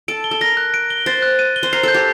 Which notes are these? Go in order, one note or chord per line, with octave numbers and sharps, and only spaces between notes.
A4 D7
G7
A4
A#4 A#6
F#6
D7
G7
C5 A6
F#6
D#7
G7
C5
A#4 C7
A4 G6
G4